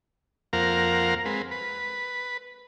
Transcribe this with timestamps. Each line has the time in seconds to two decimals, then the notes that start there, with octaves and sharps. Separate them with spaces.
0.53 F2 A#3 A#4 C5 F5 F#5
1.25 G#3 C4 B4
1.51 B4